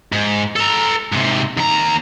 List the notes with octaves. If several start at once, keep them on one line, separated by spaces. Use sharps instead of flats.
G#2
A4 A#5
G#2 C3
D#2 A#5